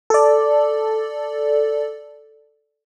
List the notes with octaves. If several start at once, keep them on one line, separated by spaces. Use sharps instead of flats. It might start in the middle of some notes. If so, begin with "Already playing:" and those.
A4 D5